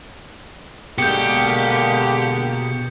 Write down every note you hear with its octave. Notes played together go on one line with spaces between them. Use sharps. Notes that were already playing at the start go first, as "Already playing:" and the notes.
B2 D3 G#3 A#3 G4 G6 C#7